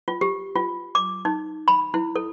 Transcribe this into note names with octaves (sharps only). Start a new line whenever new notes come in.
F4
G4
F4
D6
D#4
B5
E4
A4